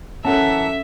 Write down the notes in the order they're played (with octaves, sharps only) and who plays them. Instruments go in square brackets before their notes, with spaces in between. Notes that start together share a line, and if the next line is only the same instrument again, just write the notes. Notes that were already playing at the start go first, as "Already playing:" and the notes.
[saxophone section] F#2 F#5 [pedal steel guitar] E3 A5 A#5 [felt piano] C#4 A4 [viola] E5